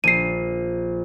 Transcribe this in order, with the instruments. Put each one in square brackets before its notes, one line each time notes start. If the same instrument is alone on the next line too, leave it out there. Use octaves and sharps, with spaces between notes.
[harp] A#1 [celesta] C7 D#7